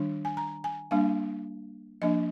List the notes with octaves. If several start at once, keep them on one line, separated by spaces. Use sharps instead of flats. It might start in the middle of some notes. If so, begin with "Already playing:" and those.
Already playing: D#3 G3 D4
G#5
A#5
G#5
G3 A#3 D4 F5
F3 A#3 D4 D#5